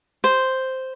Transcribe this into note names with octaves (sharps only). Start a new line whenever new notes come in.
C5